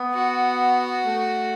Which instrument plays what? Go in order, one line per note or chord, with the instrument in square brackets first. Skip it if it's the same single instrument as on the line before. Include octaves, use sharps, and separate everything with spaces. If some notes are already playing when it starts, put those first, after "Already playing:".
Already playing: [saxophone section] B3
[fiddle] F#4
[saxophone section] A3